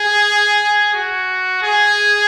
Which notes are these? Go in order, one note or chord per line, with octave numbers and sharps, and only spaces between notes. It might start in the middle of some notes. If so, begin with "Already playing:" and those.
Already playing: G#4
F#4
G#4